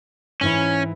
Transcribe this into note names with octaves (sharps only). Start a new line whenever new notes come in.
G#2 E3 C#4 E4